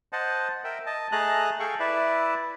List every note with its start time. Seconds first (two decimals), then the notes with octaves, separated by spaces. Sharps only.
0.13 C5 D#5 F#5 A5
0.64 A#4 E5 G5
0.86 D#5 A5
1.12 A3 G#4 D#5 A5 A#5 F#6
1.60 G#4 A4 F5 G5 C#6
1.80 E4 B4 D5 E5